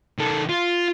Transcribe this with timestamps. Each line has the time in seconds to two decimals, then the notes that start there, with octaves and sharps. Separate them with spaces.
0.18 D#3 A4
0.49 F4